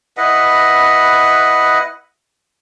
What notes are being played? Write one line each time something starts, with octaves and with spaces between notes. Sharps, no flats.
E4 B4 D#5 F#5